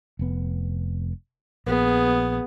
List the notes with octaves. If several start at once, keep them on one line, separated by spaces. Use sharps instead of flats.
F1 B3
A#1 B3 G#4